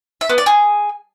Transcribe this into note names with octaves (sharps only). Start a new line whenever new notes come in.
E5
B3
D5
G#4